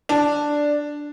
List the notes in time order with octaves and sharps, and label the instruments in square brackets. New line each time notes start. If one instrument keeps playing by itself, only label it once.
[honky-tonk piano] D4